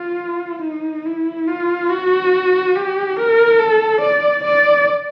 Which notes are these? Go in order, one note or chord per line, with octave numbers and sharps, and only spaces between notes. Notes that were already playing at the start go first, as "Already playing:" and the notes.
Already playing: F4
D#4
E4
F4
F#4
G4
A#4
A4
D5
D5